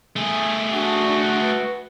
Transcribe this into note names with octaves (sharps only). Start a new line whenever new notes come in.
A3 G#4
D4 F#4
B4